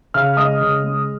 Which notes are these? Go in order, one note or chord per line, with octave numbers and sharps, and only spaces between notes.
C#3 F5 F6
G#3 D#5 D#6
C#3
G#3